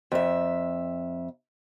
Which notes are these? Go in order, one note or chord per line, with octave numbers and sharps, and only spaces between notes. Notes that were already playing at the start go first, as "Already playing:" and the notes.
F2 E5